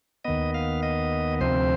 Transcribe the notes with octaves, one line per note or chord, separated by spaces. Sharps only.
D#2 D#3 B3 D#5
F5
D#5
D2 C3 F3 C4 C5